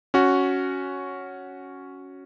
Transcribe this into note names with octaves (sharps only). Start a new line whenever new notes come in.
C#4 F#4